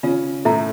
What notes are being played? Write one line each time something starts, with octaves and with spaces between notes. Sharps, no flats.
C#3 C#4 F4
A2 A3 A4 E5 A#5